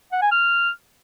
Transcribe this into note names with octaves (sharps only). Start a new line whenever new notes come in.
F#5
G#5
F6